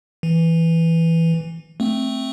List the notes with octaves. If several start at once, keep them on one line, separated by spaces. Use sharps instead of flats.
E3
A3 C4